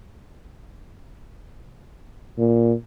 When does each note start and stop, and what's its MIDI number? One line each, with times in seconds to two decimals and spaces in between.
2.38 2.73 46